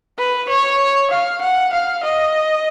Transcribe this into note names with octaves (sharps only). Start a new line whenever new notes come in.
B4
C#5
F5
F#5
F5
D#5